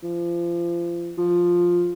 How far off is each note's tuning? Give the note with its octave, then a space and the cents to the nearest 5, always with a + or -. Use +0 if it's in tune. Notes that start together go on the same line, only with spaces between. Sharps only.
F3 -30
F3 +5